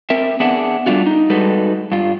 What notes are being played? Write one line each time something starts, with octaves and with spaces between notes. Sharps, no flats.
C4 A#4 E5
B3 D4 G#4 E5 F#5
G3 A3 D4 F4 F#4
D#4
G3 G#3 D#4 F#4 A4 B4
G2 F4